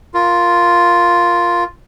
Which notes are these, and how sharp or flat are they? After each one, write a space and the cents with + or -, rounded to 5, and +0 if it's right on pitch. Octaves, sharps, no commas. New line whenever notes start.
F4 +0 A#4 +0